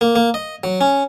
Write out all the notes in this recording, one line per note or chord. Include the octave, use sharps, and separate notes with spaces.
A#3
A#3
D#5
F#3
C#4